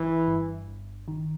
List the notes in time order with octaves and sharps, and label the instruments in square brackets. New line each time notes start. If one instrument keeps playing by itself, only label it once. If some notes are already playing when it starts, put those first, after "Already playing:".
Already playing: [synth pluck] G1 [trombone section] E3
[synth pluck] G2
G1
D#3